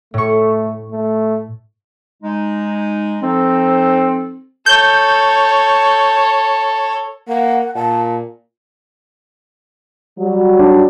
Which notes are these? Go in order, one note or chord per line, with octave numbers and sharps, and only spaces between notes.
A2 A3 C#6
A3
G#3 D#4
F3 C4 D#4 A4
A4 C#5 G6
A#3 F#5
A#2 A5
F#3 G3
D4